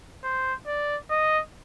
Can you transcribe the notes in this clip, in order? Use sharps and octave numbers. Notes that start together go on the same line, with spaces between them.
C5
D5
D#5